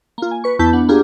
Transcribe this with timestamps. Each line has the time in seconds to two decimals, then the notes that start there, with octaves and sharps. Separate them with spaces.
0.18 A#3 F4
0.31 G#5
0.44 B4 C#6
0.59 E2 B3 E4 A5 G6 B6
0.73 B3 D4 F#5
0.89 A#3 D4 F4 G4 G#4